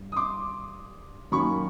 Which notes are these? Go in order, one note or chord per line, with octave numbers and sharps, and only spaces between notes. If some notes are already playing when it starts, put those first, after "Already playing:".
Already playing: G2
D#6
C6 D6
F#2 D#3 F#3 A#3 C#4 B5 C#6